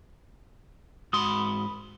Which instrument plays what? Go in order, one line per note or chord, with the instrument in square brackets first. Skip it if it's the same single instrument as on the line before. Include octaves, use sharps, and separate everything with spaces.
[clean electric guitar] G#2 F#4 C6 [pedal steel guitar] B5 D#6